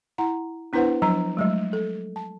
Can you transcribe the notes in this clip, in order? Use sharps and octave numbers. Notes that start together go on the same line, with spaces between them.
E4 F#5 A#5
B3 D4 E4 B4 C5 F#5
F3 F#3 D4 A#5
F#3 G#3 A3
A4
A5